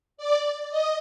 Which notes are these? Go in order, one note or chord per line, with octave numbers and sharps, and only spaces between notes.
D5
D#5